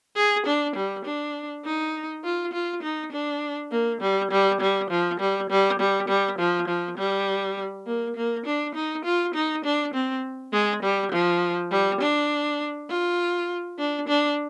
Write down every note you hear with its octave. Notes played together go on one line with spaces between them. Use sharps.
G#4
D4
G3
D4
D#4
F4
F4
D#4
D4
A#3
G3
G3
G3
F3
G3
G3
G3
G3
F3
F3
G3
A#3
A#3
D4
D#4
F4
D#4
D4
C4
G#3
G3
F3
G3
D4
F4
D4
D4